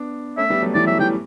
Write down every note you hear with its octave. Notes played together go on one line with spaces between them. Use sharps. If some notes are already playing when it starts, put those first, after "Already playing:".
Already playing: B3 D4
A3 C#4 E5
G3 B3
F#3 A3
E3 G3 D5
F#3 E5
E3 G3 G5